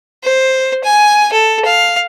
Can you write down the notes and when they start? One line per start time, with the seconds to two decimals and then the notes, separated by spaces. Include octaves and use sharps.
0.23 C5
0.84 G#5
1.33 A4
1.65 F5